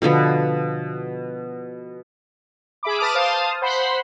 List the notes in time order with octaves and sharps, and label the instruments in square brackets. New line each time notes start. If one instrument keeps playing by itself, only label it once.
[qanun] B2 D3 F3 B3
[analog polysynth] G#4 E5 B5 D6
B4 A5 D6 D#6 F6
C5 F5 A5 D#6
C5 F#5 B5 C6